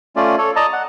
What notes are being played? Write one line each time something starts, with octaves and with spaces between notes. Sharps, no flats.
A3 C#4 F4 D5
A4 C#5
D5 D#5 A5 A#5
F#5